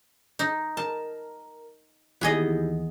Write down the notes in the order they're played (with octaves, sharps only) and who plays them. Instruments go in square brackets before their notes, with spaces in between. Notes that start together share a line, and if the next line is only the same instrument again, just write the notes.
[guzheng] D#4
[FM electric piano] A#4 [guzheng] A5
[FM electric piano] D#2 E3 [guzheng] B3 G#4 D#5 [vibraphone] D#4 E4 G4